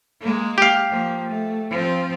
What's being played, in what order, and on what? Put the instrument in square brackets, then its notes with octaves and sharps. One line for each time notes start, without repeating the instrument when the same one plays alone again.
[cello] G#3 A#3
[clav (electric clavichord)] G4 F5
[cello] F3 A#3
A3
F3 C4